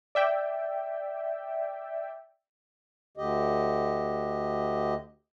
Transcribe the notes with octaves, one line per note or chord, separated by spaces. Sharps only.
D5 E5 G5
D2 D3 G4 D#5